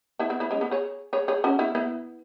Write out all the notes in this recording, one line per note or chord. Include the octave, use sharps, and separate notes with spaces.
B3 E4
B3 E4
B3 E4
G#3 C#4
B3
G#4 C#5
G#4 C#5
G#4 C#5
C#4 F#4
B3 E4
B3 E4